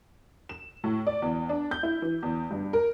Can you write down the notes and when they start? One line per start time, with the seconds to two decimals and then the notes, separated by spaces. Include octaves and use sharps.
0.49 E7
0.84 A2
1.07 D5
1.22 E2
1.49 D4
1.71 G6
1.83 E4
2.02 E3
2.23 E2
2.51 G2
2.73 A#4